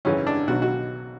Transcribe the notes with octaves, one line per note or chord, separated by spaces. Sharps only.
G#1 F#2 C#3 E3 C#4
D4
B1 B2 F#3 F#4
F#4